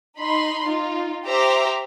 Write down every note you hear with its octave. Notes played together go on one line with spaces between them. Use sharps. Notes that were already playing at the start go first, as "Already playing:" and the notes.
D#4 B5 C6
D#4 F4
G4 C5 E5 A#5 D6